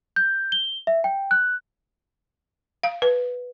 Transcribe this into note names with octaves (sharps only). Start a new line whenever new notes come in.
G6
G7
E5
G5
F#6
F5
B4